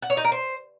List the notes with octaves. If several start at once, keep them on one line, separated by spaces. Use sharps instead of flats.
F#5
C#5
D#4
A#4
C5